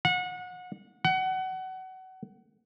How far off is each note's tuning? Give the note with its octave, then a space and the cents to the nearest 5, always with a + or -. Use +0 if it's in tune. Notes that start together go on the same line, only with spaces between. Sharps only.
F#5 -30
F#5 +25